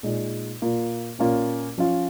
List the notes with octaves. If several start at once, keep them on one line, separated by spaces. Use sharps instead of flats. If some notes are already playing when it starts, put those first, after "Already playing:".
A#2 G#3 D#4
A#2 A#3 F4
A#2 A#3 C#4 F4
F3 C#4 F4